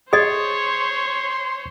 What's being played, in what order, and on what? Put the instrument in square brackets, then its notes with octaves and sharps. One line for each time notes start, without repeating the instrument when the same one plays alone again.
[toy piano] G#4 D#5 [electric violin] C5 C#5 [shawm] C6 [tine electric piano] D#6 G#6